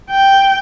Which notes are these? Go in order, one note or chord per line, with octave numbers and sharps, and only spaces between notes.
G5